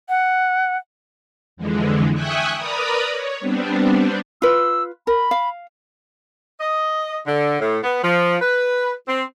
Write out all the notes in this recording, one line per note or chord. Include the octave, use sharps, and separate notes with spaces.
F#5
F2 D3 E3 G#3
E5 G5 G#5 C#6 D#6 F#6
A#4 B4 D5 A#5 B5 D#6
C#5
G3 B3 C4 D4
F4 B4 E6
A#4 B5
F5
D#5
D3
A2
B3
F3
B4
C4